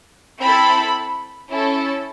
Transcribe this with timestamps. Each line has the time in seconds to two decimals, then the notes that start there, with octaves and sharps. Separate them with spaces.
0.41 C4 E4 A4 B5
1.50 C#4 E4 A4